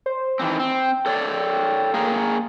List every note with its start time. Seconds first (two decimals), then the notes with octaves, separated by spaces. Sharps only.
0.06 C5
0.39 D#3 E3 C4
0.59 C4 G5
1.06 A4 C#5 D5
1.94 A#3 G#4 A#4